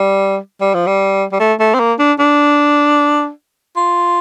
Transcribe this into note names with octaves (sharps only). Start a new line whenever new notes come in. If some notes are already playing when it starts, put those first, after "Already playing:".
Already playing: G3
G3
F3
G3
G3
A3
A3
C4
A#3
D4
D4
F4